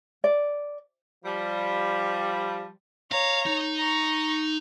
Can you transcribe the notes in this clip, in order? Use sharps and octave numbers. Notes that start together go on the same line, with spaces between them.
D5
F3 G3
C#5 F5 A#5
D#4
A#5 C#6